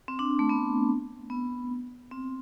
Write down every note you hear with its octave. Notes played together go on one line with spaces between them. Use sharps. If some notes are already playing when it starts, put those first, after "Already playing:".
C4
D4
A3
B3
B3
C4